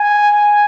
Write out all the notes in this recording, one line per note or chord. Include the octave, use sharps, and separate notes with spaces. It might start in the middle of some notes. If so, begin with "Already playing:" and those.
Already playing: G#5